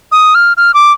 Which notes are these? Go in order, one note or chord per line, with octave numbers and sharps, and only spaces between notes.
D#6
F6
F6
D6